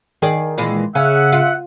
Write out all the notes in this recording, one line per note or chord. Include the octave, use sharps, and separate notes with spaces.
D#3 G#4 D5
A#2 E3 G#3
C#3 C#4 E5 F#5
F4